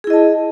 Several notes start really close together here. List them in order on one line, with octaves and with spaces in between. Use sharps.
G#4 E4 D#5 A5